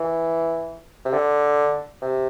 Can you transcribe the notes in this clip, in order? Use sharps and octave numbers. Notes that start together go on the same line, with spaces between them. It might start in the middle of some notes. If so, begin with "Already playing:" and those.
Already playing: E3
C3
D3
C3